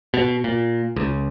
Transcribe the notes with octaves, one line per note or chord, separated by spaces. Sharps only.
B2
A#2
C#2